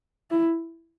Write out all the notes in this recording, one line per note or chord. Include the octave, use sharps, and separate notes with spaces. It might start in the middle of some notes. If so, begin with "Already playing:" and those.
E4